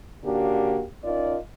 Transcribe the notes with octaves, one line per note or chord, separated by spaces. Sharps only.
C#3 A#3 D4 F#4 G4
C#4 D#4 F4 A#4 D5 D#5